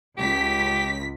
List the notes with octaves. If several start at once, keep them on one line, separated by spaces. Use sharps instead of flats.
C#2 G4 B6